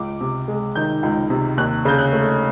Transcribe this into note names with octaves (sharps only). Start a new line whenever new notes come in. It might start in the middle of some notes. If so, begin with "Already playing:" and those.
Already playing: C#2 D6
C3
G#3
D#3 G6
C#2
C3
D#2 F#6
C#3 G6
F#6
A3